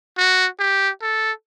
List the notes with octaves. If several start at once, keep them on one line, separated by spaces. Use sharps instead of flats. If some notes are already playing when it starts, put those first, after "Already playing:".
F#4
G4
A4